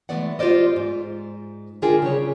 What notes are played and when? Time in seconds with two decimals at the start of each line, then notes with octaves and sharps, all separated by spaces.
0.09 E3 G#3 A3 B3 D5 F#5
0.39 F4 G4 C5 D5 D#5
0.76 G#2
1.82 D3 D4 F4 G#4 A#4 G5
2.02 C#3 G3 C#5